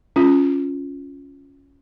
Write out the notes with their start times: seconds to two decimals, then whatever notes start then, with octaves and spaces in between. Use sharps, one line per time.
0.16 C#4 F4